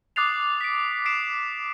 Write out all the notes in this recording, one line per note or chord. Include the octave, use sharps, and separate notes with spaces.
D6 D#6 F#6 A6 C7 F7
B6 D7
D#6 C7 D7 E7